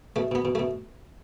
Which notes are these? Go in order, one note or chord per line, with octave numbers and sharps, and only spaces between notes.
B2 A3
B2 B3
B2
A3
B2